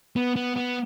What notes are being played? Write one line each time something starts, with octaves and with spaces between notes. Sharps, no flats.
B3
B3
B3